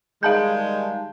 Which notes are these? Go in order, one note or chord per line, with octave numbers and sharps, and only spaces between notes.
D#3 G3 G#3 F5 A5 G6